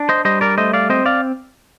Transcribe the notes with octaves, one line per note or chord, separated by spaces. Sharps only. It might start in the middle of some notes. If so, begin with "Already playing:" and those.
Already playing: D4
C5 D#5
G3 C5 D#5
A#4 D5
A3 C5 D#5
D5 F5
C4 C5 D#5
D5 F5